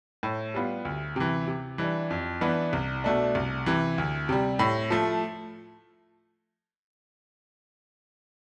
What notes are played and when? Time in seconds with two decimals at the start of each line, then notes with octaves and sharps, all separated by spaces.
0.23 A2
0.54 G3 B3 F4
0.85 D2
1.16 C3 E3
1.48 C3
1.78 E3 G3 D4
2.10 F2
2.41 E3 B3 D4
2.73 C2
3.04 B2 A3 D4
3.35 C2
3.66 C3 E3
3.98 D2
4.29 C3 G3
4.59 A2
4.90 F3 A3